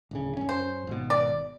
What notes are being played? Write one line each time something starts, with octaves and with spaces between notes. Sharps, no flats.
D1 C#3
F#2 C#4
C5
G#1 B2
D5